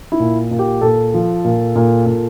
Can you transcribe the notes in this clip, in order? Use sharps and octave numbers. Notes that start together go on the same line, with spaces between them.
E4
A#2
A#2
G4
A#2 A4
F3
A#2
A#2
A#2